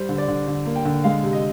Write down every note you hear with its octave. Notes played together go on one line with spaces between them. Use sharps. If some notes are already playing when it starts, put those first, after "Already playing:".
Already playing: G3 C5
D3
D5
D3
D3
A#3
G5
D3
G#3 F5
C3
D#5